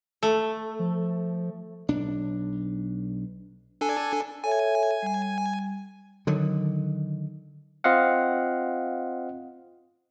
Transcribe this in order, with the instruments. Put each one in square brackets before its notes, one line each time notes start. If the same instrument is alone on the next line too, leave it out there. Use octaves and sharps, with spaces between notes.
[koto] A3
[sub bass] F3
[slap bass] B1 D4
[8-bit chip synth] D4 A4 G#5
[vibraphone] A4 C#5 E5 [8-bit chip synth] G#5
[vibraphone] G3
[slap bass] D3 D#3 F#3
[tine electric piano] C4 F4 D#5 F5 F#5